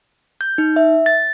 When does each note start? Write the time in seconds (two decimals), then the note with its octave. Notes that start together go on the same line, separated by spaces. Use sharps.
0.41 G6
0.58 D#4
0.76 E5
1.06 A6